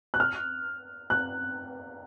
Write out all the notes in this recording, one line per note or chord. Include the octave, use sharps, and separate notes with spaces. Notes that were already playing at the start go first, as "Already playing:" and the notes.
F#6
F6
F#6